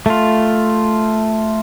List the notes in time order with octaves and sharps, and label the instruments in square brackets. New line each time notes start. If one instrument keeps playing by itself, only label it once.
[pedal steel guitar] A3 F4